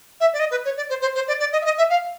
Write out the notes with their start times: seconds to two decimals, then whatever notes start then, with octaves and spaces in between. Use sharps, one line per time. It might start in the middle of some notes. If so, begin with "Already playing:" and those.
0.20 E5
0.33 D5
0.39 D#5
0.51 B4
0.65 C#5
0.77 D5
0.90 C5
1.01 C5
1.15 C5
1.28 D5
1.40 D5
1.52 D#5
1.62 E5
1.65 D#5
1.78 E5
1.90 F5